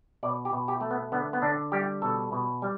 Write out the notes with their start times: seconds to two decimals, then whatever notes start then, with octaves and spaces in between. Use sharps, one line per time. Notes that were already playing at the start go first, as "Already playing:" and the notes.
0.23 B2 D5
0.45 G4
0.53 B2
0.68 G4
0.81 A3
0.91 B3
1.12 D3 B3
1.33 B3
1.42 D3 D4
1.72 G3 G4
2.02 B2 A4
2.32 B2
2.62 G3